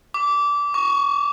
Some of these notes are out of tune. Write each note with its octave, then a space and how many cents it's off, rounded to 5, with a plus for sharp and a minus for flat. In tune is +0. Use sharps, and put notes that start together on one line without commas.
D6 -20
C#6 +15